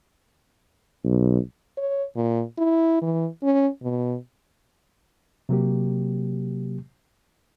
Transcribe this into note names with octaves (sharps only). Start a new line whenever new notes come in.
B1
C#5
A#2
E4
E3
C#4
B2
C3 F#3 A#3 G4